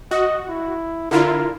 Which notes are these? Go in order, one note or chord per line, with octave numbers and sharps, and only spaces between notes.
F#4 D#5
E4
D3 E4 F4 A#4